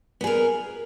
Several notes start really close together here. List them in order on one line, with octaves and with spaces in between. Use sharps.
B3 G#4 A#4